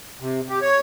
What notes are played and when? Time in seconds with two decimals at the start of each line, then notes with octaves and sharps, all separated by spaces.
0.20 C3
0.49 G4
0.62 C#5